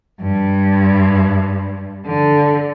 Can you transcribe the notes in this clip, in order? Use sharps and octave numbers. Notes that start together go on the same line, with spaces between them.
G2
D3